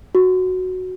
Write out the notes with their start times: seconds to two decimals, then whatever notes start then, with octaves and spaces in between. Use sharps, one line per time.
0.15 F#4